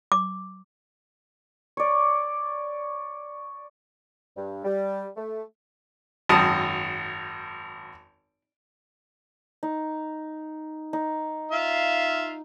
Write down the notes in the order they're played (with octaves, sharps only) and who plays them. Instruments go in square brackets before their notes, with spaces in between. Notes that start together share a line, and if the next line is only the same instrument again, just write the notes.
[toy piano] D6
[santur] C#5 D5
[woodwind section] G2
G3
A3
[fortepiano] G#1 F#2 A5 D#6
[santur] D#4
D#4
[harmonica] F4 E5 F5